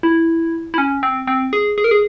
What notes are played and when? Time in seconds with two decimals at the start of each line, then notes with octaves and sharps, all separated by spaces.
0.03 E4
0.74 E4
0.78 C#4
1.03 C4
1.27 C4
1.53 G#4
1.78 G#4
1.84 A#4
1.91 G#4